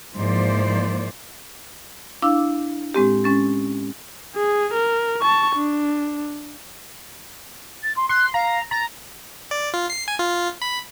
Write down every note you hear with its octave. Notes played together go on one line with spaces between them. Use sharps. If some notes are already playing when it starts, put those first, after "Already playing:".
G#2 E3 F3 A#3 C5 D5
D4 E4 F5 D6 E6
A2 G#3 C4 G4
G#3 C#4 A6
G#4
A#4
A5 C#6
D4
A6
C6
C6 F#6
F5 A#5
A#5 A6
D5
F4
C7
G#5
F4
B5